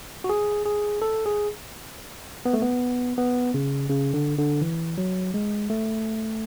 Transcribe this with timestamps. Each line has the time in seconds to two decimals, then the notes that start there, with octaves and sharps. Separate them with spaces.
0.24 F#4
0.29 G#4
0.66 G#4
1.02 A4
1.26 G#4
2.45 B3
2.53 A3
2.62 B3
3.18 B3
3.54 C#3
3.89 C#3
4.14 D3
4.38 D3
4.61 E3
4.98 F#3
5.34 G#3
5.70 A3